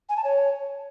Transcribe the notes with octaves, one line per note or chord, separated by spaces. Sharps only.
G#5
A5
C#5